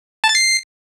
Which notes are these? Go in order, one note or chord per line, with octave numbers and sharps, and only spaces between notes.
A5
A6
C7